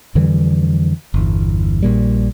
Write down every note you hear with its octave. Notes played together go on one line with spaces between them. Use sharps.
F2 D3 E3 G3
G1 E2
A#1 A#2 G3